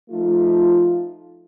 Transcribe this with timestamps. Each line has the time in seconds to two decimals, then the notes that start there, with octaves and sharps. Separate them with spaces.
0.10 F3 A3 D#4 F4